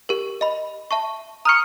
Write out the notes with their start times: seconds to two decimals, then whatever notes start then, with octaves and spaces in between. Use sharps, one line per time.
0.09 G4 A#4
0.41 D#5 B5
0.91 E5 A5 C#6
1.45 A#5 C#6 D#6 F6 C#7